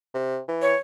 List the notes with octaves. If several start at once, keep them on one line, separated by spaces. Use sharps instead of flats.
C3
E3
C#5